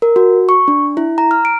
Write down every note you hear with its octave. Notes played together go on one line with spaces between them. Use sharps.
A#4
F#4
C#6
D4
E4
A#5
F6
D7